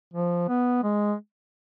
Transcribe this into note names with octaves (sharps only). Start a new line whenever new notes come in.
F3
B3
G#3